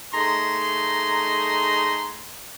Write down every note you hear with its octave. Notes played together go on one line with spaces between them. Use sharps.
A3 D#4 G#4 A#5 C6